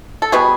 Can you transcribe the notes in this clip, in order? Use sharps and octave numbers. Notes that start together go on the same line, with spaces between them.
A4
B2 G3 B3 F#4 G#4